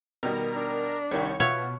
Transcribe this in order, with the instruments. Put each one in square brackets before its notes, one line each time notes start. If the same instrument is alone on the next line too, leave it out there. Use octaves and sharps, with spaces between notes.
[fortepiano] B2 D#3 G3 [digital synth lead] A#4
[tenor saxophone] D4
[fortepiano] C2 D#3 G3 [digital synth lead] C#5
[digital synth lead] B2 [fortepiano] F4 E5 F#5 [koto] C#5